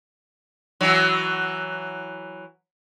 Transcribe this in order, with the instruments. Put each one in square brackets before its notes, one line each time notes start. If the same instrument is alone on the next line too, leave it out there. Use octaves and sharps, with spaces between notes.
[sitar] E3 F#3